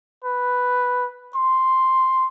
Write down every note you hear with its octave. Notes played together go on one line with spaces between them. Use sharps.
B4
C6